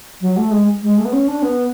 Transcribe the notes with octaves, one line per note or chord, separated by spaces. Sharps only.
F#3
A3
G#3
G#3
A3
B3
C#4
D4
B3